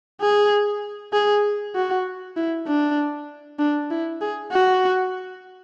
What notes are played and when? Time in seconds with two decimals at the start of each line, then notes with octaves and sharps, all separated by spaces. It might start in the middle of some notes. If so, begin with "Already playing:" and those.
0.22 G#4
1.13 G#4
1.76 F#4
2.37 E4
2.67 D4
3.59 D4
3.91 E4
4.21 G#4
4.52 F#4